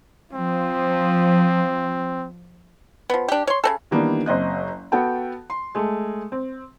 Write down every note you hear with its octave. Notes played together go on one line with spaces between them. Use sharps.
F3 C4
F3 B3
D4 G4
C#5 C6
C#3 C4 A4
D#3 E3 G3 A#3 B3 D4
F#1 C4 D#5 F#6
B3 F#4 A4 F#5 G5 A5
C6
G#3 A3
C4